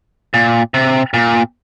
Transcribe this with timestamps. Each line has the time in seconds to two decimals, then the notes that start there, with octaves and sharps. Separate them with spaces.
0.34 A#2
0.74 C3
1.14 A#2